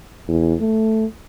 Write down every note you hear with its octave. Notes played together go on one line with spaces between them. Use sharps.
E2
A3